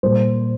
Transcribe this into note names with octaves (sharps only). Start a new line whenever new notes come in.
A#2 G3 C5